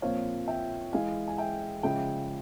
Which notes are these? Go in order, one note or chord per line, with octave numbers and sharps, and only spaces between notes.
A#2 F3 C4 C#5 F5
E5 G5
E3 G#3 E4 F5 G#5
G#5
E5 G5
C#3 F3 G#3 E5 G5